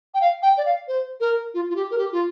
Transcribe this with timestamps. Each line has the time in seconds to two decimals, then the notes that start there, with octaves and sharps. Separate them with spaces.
0.14 G5
0.21 F5
0.42 G5
0.57 D5
0.65 F5
0.88 C5
1.20 A#4
1.54 F4
1.70 F4
1.76 G4
1.91 A#4
1.98 G4
2.12 F4